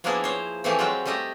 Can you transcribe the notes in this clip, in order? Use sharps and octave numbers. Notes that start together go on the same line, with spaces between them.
F3 A#3 B3 D4 E4 G#4
C5 C#5
E3 F3 A3 C4 G4 G#4
F#3 G#3 F4 E5 F#5 G5
G3 A3 G4 D#5 E5